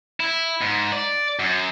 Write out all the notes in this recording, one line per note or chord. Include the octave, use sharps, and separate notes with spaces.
E4
G#2
D5
F#2